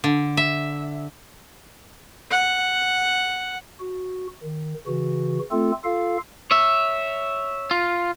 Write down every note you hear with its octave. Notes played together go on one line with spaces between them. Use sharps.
D3
E5
F#5
F#4
D#3
C#3 E3 F#4
A3 C4 F4 A4
F4 A4 F5
C#5 E5
F4